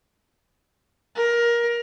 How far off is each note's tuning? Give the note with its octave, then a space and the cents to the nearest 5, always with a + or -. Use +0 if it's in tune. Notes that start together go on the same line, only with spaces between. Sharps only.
A#4 +20